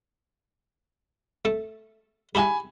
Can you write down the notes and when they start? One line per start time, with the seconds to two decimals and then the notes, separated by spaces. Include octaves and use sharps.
1.45 A3 A4
2.35 E4 G4 G#4 G#5 B5